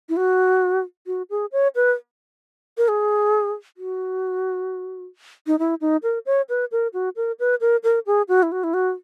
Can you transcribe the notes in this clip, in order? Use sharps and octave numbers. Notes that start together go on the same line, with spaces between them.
E4
F#4
F#4
G#4
C#5
B4
A#4
G#4
F#4
D#4
E4
D#4
A#4
C#5
B4
A#4
F#4
A#4
B4
A#4
A#4
G#4
F#4
E4
F#4
E4
F#4